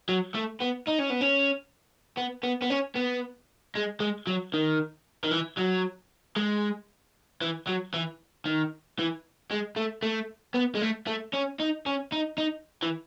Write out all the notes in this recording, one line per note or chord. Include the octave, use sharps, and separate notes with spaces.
F#3
A3
B3
D#4
C#4
B3
C#4
B3
B3
B3
C#4
B3
G#3
G#3
F#3
D#3
D#3
E3
F#3
G#3
E3
F#3
E3
D#3
E3
G#3
A3
A3
B3
G#3
A3
A3
C#4
D#4
C#4
D#4
D#4
E3